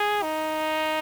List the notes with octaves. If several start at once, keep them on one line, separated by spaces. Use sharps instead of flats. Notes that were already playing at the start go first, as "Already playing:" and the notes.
Already playing: G#4
D#4